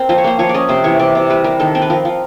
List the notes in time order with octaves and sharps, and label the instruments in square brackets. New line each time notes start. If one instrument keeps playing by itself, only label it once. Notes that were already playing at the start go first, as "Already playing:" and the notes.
Already playing: [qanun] C4 A#4
F3 C5
C#5
A#3 C5
F3 C#5
D5
C#4 D#5
C3 C5
E3 C#5
C3 D5
C3
G3 B4
G3 A#4
D#3 A4
C4
B4
F3 A#4
F3